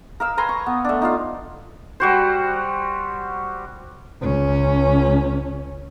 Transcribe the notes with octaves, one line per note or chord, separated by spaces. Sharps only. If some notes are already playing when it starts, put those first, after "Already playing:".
A#4 F5 E6
B4 G#5 A#5 C6
C#6
B3
A3 D4
D#4 F4 F5
G3 F#4 C5
C#2 C#4